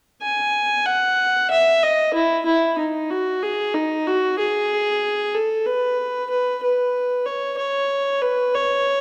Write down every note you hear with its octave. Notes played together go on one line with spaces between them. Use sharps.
G#5
F#5
E5
D#5
E4
E4
D#4
F#4
G#4
D#4
F#4
G#4
A4
B4
B4
B4
C#5
C#5
B4
C#5